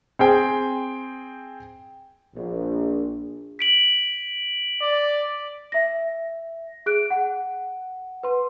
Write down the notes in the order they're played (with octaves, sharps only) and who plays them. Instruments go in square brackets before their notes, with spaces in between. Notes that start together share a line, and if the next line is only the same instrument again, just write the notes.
[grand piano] C4 G#4 G5
[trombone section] A#1
[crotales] B6 D7 F#7
[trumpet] D5
[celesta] E5 A#6
G#4 F#6 D7
F#5
B4 C6